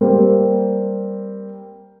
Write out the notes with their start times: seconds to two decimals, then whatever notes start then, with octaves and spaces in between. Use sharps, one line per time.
0.01 G3 A#3 C4